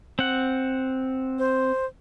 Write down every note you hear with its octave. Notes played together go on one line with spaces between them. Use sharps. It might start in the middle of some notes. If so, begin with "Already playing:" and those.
C4 F#5
C5